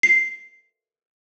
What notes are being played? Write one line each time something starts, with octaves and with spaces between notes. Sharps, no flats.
C7